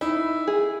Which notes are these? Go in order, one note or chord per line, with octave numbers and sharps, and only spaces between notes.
D#4 E4
G#4